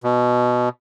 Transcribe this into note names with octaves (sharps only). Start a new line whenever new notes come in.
B2